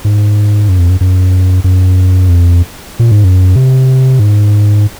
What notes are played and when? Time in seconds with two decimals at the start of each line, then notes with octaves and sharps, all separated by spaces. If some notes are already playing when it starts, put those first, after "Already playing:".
0.05 G#2
0.69 F#2
0.79 F2
0.90 F#2
1.01 F#2
1.64 F#2
2.29 F2
2.99 A#2
3.11 G#2
3.24 F#2
3.56 C3
4.19 G#2